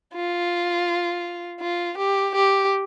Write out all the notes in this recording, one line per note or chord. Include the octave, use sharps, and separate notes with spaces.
F4
F4
G4
G4